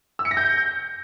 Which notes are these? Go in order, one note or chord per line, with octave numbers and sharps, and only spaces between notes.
E6
C#7
A#6
G6